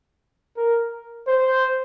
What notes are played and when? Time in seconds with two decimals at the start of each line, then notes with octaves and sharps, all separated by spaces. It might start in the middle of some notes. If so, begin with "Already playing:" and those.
0.57 A#4
1.27 C5